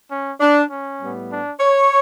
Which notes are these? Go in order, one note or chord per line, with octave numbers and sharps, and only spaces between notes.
C#4
D4
C#4
A2 G3 B3
D4
C#5